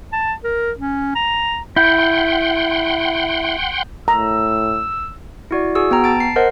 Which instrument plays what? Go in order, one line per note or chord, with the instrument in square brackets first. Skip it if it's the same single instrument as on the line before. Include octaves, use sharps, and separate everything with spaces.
[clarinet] A5
A#4
C#4
A#5
[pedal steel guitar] E4 [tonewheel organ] F#5 G5 C6 [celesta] G6
[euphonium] A2 [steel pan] A#5 [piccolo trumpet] E6
[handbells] E4 F#4 D5
F#4 G#4 E6
B3 G5 A#5
A5 A6 D7
C7
A#4 C5 D#5 F#5